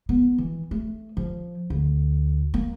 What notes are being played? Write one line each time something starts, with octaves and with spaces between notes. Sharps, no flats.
B3
E3
A3
F3
D2
A#3